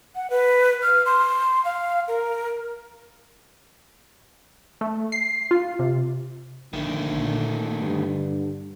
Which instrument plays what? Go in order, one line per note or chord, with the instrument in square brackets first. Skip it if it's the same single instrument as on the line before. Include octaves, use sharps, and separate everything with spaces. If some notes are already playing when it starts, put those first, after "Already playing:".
[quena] F#5
B4
F6
C6
F5
A#4
[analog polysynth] A3
C7
F4
C3
[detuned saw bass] A#1 [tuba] D3 [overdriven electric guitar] D#3 A3
[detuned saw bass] A#2
[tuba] G2 [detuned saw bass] D3